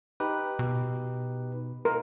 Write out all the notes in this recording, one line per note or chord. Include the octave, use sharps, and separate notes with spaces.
D#4 G4 B4
B2
A#4